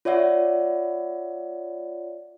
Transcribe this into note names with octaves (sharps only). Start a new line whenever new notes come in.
F4 C#5 D5 E5 F#5